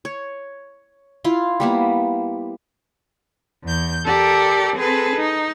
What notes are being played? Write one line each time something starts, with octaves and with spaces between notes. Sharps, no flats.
C#5
E4 F4 C6
G3 A#3 B3
E2 G6
G4 A4 A#4 D5
C4 G#4 A4 B4
D#4